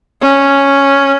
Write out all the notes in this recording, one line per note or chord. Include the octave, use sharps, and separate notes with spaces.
C#4